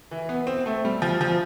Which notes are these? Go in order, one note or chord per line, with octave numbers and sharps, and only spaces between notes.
E3
B3
C4
A3
G3
F3
F3